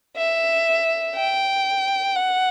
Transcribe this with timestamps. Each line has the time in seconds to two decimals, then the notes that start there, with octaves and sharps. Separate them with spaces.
0.17 E5
1.16 G5
2.16 F#5